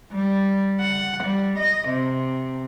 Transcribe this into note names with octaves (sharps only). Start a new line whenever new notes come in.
G3
F#5
G3
D#5
C3